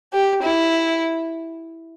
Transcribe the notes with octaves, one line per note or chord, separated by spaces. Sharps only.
G4
E4